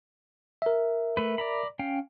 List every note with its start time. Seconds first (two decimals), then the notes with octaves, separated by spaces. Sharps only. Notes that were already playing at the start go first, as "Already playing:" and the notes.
0.62 A#4 E5
1.17 A3 B4
1.38 D5 A#5 B5
1.79 C#4 F5 G5